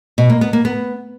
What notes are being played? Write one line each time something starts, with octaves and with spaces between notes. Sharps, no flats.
B2
A#3
B3
A#3
B3